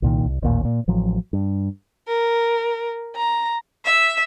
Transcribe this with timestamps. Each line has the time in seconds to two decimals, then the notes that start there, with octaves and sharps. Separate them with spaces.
0.02 C2 A#2 D#3
0.25 C2
0.42 A1 D#2 A#2
0.65 A#2
0.88 A1 F3 F#3
1.33 G2
2.08 A#4
3.16 A#5
3.84 E5